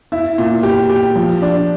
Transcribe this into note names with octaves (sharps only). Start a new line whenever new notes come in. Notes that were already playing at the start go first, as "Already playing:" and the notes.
E4
A#2
G4
G4
F3
D4